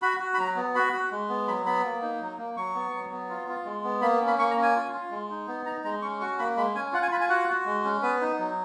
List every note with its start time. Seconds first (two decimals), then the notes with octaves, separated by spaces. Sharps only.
0.02 F#4 B5
0.20 F#4
0.34 B5
0.38 F#3 A#5
0.56 B3
0.75 F#4 B5
0.93 F#4
1.11 G#3
1.29 B3
1.47 F#3 B5
1.66 B3 B5
1.84 A#3
2.02 D#4
2.20 F#3
2.38 A#3
2.56 F#3 C#6
2.75 B3
2.93 F#3
3.11 B3
3.29 F4
3.48 F4
3.65 G#3
3.84 B3
4.02 A#3 B5
4.21 C#4
4.27 B5
4.39 A#3 C#6
4.50 A#5
4.57 C#4
4.63 G#5
4.75 F4
4.93 F4
5.11 G#3
5.30 D#4
5.48 B3
5.66 D#4 A#5
5.84 G#3 A#5
6.02 C#4 C#6
6.21 F#4 C#6
6.39 A#3 B5
6.57 G#3 B5
6.75 C#4 G#5
6.93 F4 F#5
7.02 G#5
7.12 F4 B5
7.21 G#5
7.29 F#4 F#5
7.48 F#4
7.66 G#3
7.84 C#4
8.02 B3 B4
8.21 D#4
8.39 F#3